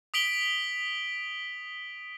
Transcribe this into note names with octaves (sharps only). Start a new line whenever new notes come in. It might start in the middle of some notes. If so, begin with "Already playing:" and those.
D#6 B6 D7 F#7 G7